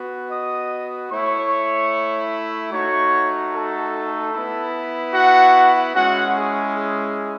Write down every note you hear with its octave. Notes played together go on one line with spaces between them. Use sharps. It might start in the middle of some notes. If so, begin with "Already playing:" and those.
Already playing: B3 F#4
D#5 D#6
A3 E4 C#5 C#6
A3 D#4 F#4 C#5 C#6
A4 A5
B3 E4
F#4 F#5
G#3 C#4 E4 F#4 F#5
G#4
G#4